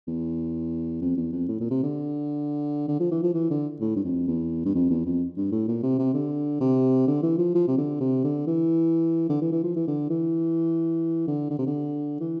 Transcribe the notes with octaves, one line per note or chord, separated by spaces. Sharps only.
E2
F2
E2
F2
A2
A#2
C3
D3
D3
F3
E3
F3
E3
D3
A2
G2
F2
E2
G2
F2
E2
F2
G2
A2
A#2
C3
C3
D3
C3
D3
E3
F3
F3
C3
D3
C3
D3
E3
D3
E3
E3
F3
E3
D3
E3
D3
D3
C3
D3
E3